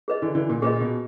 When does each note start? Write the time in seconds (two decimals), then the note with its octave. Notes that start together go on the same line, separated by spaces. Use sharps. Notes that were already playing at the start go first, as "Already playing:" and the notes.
0.08 G#4 B4 D#5
0.22 D3 E3
0.35 D3 E3
0.50 A#2
0.62 A#2 G#4 B4 D#5
0.80 B2